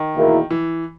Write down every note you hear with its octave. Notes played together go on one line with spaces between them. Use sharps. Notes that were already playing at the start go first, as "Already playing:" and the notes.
Already playing: D#3
E2 B2 A#3 E4 A#4
E3